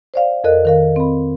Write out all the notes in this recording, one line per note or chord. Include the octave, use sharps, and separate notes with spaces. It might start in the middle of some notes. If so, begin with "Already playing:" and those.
C5 D5 F5
F2 A4 A#4 D#5 F#6
D#3 A#4 F5
C4 B5